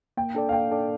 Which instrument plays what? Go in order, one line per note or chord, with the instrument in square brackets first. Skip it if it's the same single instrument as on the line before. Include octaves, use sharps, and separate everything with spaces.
[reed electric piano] A#3 [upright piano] G5
[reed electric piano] D4 A4 D5
[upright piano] F5
[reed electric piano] A#3 [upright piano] G5
[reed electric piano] D4 A4 D5